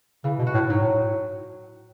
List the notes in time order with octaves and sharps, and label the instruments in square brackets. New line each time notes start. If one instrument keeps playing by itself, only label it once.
[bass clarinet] C#3 [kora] E3
[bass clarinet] B2
[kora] F#4
[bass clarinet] A2
[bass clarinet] G#2 [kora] F#3
[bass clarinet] A2